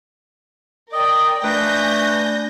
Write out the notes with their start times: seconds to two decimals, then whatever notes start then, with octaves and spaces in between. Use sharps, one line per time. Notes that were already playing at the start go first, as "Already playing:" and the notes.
0.93 A#4 D5 D#5 G5
1.44 A3 D4 F4 B4 D5 G#5 G6 A#6